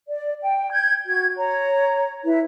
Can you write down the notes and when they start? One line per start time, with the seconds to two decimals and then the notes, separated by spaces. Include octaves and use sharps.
0.08 D5
0.41 G5
0.70 G6 G#6
1.05 F#4 G#6
1.37 C#5 A#5
2.23 E4 B4